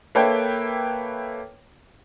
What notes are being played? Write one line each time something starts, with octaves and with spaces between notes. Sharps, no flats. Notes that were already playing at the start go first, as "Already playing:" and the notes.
A#3 A4 B4 C#5 E5 G5